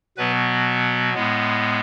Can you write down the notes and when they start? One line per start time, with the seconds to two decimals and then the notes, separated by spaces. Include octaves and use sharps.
0.17 B2 F#3 B3 B4
1.14 A2 G#3 B3